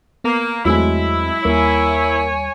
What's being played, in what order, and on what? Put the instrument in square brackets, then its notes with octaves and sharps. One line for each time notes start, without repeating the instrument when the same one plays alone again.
[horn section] A#3 [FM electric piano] B3
[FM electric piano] E2 A3 C4 [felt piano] F#3 G#3 [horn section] E4
[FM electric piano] D#2 G3 [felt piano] A#3 [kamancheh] C#5 G#5